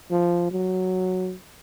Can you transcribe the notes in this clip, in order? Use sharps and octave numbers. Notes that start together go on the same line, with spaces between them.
F3
F#3